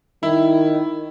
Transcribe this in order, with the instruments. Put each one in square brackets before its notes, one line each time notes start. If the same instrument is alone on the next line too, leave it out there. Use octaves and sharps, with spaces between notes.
[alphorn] D#3 [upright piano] E4